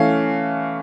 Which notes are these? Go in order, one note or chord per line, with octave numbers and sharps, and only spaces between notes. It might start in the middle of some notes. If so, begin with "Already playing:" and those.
Already playing: E3 A3 C#4 F5